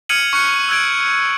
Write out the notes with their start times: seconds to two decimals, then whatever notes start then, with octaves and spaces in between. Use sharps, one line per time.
0.09 D#6 F6 G#6 C#7 D#7 F#7
0.33 C#6 F6 F#6 C#7
0.69 E6 F#6 G#6 D7